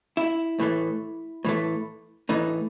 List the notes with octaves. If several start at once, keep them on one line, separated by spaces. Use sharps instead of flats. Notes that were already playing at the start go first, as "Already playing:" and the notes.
E4
A2 E3 A3
A2 E3 A3
A2 E3 A3 D#4